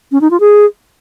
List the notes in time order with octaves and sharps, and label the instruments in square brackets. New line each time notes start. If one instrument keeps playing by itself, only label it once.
[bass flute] C#4
D#4
F4
G#4